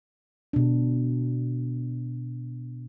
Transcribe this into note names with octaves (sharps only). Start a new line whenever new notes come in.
B2 D4